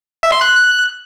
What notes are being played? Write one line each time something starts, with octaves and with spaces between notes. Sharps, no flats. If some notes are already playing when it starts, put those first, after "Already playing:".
E5
C6
F#6